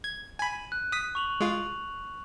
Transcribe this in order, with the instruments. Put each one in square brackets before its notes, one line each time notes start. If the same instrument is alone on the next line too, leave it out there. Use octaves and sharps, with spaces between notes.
[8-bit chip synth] G#6
[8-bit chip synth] G#5 B5 [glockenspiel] D#7
[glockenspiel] F#6
[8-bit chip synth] D#6 B6
[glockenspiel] C#6 F7 F#7
[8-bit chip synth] G#3 F4 [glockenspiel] F7